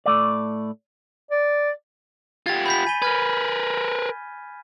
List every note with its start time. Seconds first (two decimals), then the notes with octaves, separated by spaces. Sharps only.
0.06 A2 A3 D5
1.31 D5
2.46 F4 G4 G#6 A6
2.66 B5 G6 B6
2.87 G#5 D#7 G7
3.02 A#4 B4 F6 G#6